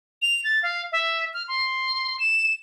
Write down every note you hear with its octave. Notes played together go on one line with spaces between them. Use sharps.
F7
A6
F5
E5
F6
C6
E7